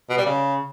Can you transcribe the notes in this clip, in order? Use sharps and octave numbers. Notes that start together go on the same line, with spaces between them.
B2
G3
C#3